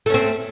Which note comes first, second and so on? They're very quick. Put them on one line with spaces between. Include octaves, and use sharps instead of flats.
A3 C#4 C4